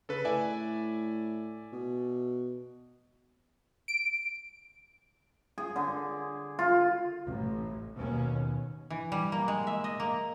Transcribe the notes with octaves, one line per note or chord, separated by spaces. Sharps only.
C#3 A4 B4
A2 D5 E5 G#5
B2
D7
G#4
D3
F4
A1
D#2 B2 C#4
E3
G3
A#3
G#3
E5
D#5
A#3